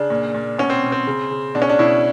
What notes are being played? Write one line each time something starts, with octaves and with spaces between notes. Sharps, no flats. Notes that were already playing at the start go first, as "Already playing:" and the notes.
Already playing: C#3 D4
A#2
A#2
B2 C#4
C4
B2
C4
C#3
C#3
B2 D4
C#4
D4
B2 E4